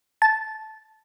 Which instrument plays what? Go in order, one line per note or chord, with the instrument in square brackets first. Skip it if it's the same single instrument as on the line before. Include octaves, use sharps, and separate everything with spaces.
[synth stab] A5